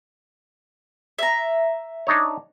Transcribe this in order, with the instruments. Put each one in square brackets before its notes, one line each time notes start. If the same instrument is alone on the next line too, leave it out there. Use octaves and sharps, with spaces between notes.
[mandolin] E5 A#5
[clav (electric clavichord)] D4 D#4 C#5